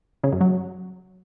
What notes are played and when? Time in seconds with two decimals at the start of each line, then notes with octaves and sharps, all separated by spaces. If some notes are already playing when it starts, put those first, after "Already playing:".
0.24 C#3
0.32 F#2
0.41 F#3